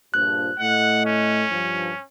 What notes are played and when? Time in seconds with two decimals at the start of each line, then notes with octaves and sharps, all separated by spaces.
0.14 A#1 G2 F3 F#6
0.59 A2 A3 D#5 F#5
1.06 C#4
1.50 G2 F3